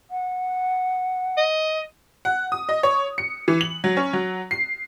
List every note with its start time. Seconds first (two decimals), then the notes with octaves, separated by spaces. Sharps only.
0.11 F#5
1.37 D#5
2.25 F#5
2.52 D#6
2.69 D#5
2.83 C#5
3.18 C#7
3.48 E3
3.61 F#7
3.84 F#3
3.97 C#4
4.13 F#3
4.51 C7